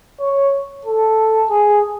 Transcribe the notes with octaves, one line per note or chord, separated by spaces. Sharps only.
C#5
A4
G#4